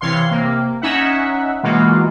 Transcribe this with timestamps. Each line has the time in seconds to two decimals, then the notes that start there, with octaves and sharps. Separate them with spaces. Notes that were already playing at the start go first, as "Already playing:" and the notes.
0.01 C3 E3 C#5 F5 C6
0.31 C3 A#3
0.82 C#4 D#4 E5 F#5
1.63 B2 E3 G#3 A#3 F4 F#4